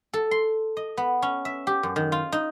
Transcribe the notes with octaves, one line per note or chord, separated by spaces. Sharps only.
A4
C6
D#5
B3
C#4
E5
G4
F#2
D#3
F4
D#4